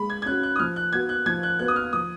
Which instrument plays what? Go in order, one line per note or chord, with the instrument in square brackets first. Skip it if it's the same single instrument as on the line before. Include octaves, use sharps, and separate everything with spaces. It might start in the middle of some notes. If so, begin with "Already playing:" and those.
Already playing: [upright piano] G#3 [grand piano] B5
[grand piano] G#6
G#6
[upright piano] C#4 [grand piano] F#6
[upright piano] F#4
[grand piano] F#6
D#6
[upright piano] F3 [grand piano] F6
[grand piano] F#6
[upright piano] B3 F#4 [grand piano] G#6
[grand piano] F#6
[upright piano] F3 [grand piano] G#6
[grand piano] F#6
[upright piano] B3 F#4 [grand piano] F#6
[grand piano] D#6
F6
[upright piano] F3 [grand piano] D#6